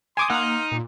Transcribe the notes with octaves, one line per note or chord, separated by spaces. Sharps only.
G#5 C6 D6 D#6
A#3 D#4 F#5 C6 D#6 F6
A#2